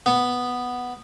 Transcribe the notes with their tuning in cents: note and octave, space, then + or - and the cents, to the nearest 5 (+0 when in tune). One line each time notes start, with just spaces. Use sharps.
B3 +0